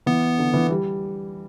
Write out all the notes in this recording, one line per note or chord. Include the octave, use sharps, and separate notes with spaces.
E3 B3
D3
E3
G3